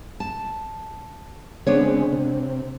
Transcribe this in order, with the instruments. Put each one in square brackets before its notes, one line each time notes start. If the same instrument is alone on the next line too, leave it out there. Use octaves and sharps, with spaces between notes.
[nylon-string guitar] A5
[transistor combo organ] C#3 G#3 C4 [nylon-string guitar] B3 D4 C#5
[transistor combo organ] C3